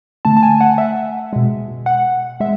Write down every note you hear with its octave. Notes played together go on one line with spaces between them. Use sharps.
D3 A3 A5
A5
G#5
F#5
E5
B2 G#3
F#5
G#3 E5